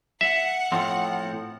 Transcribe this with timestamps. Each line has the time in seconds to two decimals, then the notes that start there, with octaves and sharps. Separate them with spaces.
0.21 E5 F#5
0.72 A2 F3 C4